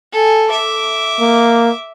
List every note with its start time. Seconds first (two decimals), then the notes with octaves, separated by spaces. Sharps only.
0.12 A4 G#5
0.49 E5 D6
1.20 A#3